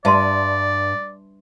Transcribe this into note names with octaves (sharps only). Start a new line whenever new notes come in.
G2 D5 E5 A5 C6